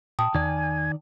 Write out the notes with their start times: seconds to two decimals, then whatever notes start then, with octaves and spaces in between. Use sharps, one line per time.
0.19 A#2 G5 A5 D#6
0.35 E2 D#3 D5 G#5